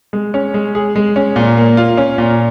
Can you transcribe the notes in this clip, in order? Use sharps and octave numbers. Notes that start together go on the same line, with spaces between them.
G#3
C#4
G#3
G#4
G#3
C#4
A#2
A#3
F4
C#4
A#2